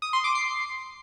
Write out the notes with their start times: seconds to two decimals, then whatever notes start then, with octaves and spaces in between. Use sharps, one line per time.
0.02 D#6
0.13 C6
0.24 D6
0.35 C7